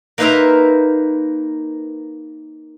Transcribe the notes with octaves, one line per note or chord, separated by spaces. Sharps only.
A#3 D#4 B4 C5 E5 F5